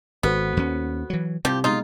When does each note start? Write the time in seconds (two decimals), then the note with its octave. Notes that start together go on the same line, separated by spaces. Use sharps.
0.23 G#1 B3 F#4 A4 C5
0.57 D#2 C#4
1.10 E3 F#3
1.45 C2 C3 F3 G4
1.64 B1 G#3 D#4 F4